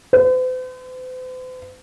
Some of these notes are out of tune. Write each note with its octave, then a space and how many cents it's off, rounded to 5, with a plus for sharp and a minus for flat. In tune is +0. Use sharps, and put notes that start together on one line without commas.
C5 -45